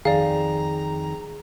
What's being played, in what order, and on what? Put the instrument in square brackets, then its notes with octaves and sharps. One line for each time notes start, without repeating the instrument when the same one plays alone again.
[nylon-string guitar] F2 D#3 [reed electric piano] G#4 [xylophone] D5 F5 [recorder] A#5